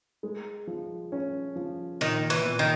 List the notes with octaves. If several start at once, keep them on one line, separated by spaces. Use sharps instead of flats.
G#3
F3
C#4
F3
A#2 D#3
E3
A#2
D#3